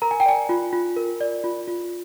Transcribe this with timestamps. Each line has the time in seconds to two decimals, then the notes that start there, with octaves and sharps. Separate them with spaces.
0.02 A#4 A#5
0.11 G#5
0.20 G5
0.26 D5 G#5
0.49 F4
0.73 F4
0.97 A#4
1.21 D5
1.44 F4
1.67 F4